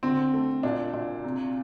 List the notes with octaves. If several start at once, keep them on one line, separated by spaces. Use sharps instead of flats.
D3 C4
A3
A#2 D4
A#2
C3